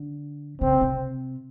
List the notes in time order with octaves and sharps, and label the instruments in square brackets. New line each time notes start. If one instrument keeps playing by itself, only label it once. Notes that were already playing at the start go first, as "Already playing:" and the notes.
Already playing: [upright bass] D3
[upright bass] C#3 [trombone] C4
[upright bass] C3